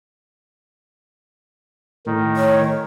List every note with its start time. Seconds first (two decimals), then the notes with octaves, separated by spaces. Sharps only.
2.06 A2 D#3
2.37 C#5